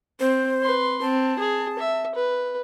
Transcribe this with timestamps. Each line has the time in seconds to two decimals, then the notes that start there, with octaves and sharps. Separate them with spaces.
0.20 C4 C5
0.63 B4 C6
1.02 C4 A5
1.39 G#4
1.79 E5
2.15 B4